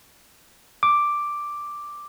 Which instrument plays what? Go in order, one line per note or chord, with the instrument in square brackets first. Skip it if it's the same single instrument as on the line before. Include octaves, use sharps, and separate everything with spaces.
[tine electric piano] D6